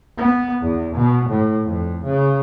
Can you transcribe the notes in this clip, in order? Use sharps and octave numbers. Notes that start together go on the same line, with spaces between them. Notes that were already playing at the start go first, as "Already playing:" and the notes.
B3
E2
B2
A2
F2
C#3